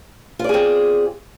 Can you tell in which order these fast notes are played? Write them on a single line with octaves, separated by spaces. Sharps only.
F4 D5 G#4 C4